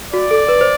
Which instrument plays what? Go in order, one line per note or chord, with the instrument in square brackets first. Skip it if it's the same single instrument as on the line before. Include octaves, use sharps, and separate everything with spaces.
[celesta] F#4 [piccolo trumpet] D5
[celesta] A4
B4
C5